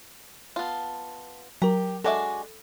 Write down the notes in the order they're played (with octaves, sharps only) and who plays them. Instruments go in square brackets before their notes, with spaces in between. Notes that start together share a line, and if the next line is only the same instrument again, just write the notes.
[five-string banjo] B3 F4 [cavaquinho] A5
[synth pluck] F#3 A#4 [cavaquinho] G4 [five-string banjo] A#5
[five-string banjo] G#3 D4 E5 [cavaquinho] F#4 G#5 D6 [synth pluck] A4